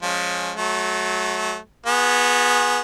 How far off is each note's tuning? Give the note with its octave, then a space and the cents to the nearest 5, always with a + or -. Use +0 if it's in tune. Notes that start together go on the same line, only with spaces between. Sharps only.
F3 +20 G#3 +5 C#4 +0
F#3 +0 A3 -30
B3 -15 F4 +45 G#4 +0